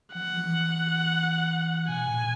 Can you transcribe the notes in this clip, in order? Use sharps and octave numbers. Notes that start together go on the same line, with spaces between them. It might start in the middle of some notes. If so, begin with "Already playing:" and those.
F3 F#5
F3
E3
B2 G#5
A#2